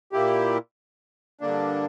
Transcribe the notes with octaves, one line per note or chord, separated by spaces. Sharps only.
A#2 A#3 E4 G4
G2 D3 A#3 D4